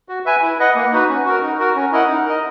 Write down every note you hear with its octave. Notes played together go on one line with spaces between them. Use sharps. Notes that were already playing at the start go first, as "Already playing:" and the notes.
F#4
B4 E5 G#5
E4
B4 D#5 F#5
A#3
D#4 F#4 B4
C#4
F#4 A#4
D#4
F#4 A#4
C#4
E4 A#4 D#5 F#5
D#4
A#4 D#5